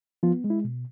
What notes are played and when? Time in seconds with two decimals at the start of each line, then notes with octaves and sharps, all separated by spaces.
0.23 F3 B3 F4
0.44 G#3
0.50 E4
0.64 B2